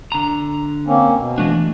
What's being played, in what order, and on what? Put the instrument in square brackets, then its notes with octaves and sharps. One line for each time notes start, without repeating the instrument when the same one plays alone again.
[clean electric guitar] D3 A#5
[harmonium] A#3 C4 C#4
B2
[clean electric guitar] E3 A3 D4